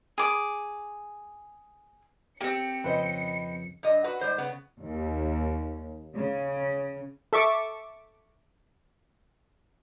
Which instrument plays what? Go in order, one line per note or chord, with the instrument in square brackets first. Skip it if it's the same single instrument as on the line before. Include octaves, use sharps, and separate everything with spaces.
[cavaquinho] G#4 D6
[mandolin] A#3 C4 [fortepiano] G4 [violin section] C#7
[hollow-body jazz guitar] F2 C#3 [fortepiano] B4 C5 D#5
[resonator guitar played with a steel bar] G2 D#5
F#4 B4 F#5
G#2 G3 C5
C#3 B3
[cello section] D#2
C#3
[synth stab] A4 E5 C#6 D6